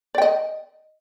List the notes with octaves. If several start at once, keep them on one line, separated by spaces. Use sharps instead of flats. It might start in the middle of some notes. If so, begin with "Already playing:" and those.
D5 D#5 G5